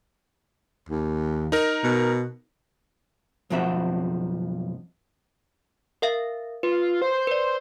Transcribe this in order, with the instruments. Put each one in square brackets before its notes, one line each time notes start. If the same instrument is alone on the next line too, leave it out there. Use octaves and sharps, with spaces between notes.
[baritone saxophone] D#2
[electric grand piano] D#4 A#4
[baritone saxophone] B2
[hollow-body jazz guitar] B1 F2 F3 C4 F#4 E5
[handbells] A#4 E5 F5
[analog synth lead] F4 [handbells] B4
[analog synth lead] C5
[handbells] B4 D5